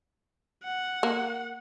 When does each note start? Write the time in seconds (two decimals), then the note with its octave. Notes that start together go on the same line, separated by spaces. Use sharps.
0.63 F#5
1.03 A#3